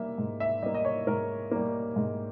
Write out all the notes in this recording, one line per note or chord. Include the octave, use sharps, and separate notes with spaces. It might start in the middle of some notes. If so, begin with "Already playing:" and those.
Already playing: G3 A#3 E5
G#2
E5
G3 A#3 D#5
D#5
C#5
G#2 A#4
G3 A#3
G#2